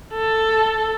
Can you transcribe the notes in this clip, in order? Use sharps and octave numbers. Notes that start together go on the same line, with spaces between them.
A4